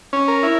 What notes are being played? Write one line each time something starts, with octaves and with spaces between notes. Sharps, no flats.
C#4
A#4
E4